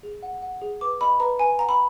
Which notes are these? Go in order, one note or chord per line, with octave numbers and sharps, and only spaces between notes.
G#4
F#5
F#5
G#4
B4 D6
D#5 B5
B4 A#5
B4 G#5
F#5 A#5
B5